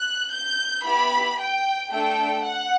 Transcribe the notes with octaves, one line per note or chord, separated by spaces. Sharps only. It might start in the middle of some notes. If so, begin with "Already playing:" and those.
Already playing: F#6
G6
B3 E4 G4 B5
G5
A3 D4 A4 G5
F#5